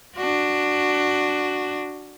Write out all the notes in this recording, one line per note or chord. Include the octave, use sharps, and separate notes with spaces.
D4 F#4